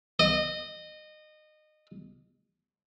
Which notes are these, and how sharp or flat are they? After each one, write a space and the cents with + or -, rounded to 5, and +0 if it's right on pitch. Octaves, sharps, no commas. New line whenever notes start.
D#5 -25